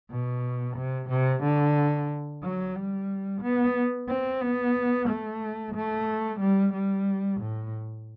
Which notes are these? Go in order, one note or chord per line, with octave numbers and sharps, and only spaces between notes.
B2
C3
C3
D3
F#3
G3
B3
C4
B3
A3
A3
G3
G3
A2